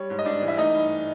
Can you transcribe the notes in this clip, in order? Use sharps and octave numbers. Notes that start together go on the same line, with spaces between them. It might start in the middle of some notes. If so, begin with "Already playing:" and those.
Already playing: G3 C#5
G#2
D#5
G#2 D4 D5
E3
E5
A3 D#4 D#5
G2